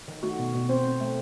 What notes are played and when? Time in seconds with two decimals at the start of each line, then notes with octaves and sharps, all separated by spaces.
0.08 D#3
0.23 A3 F#4
0.39 B2
0.54 B2
0.69 C4 C5
0.84 C4
1.00 A3